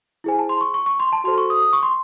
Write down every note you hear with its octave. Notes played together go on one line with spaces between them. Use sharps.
E4 G#4 C5 G#5
A5
C6
C#6
C#6
C#6
C6
A5
F#4 A4 C5 C6
C#6
D#6
D#6
C#6
C6